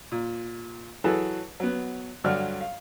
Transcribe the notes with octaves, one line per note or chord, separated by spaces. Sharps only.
A#2
E3 F#3 G#4 A4 B4 A5
F#3 B3
G2 D3 F#3 D5 F6
F5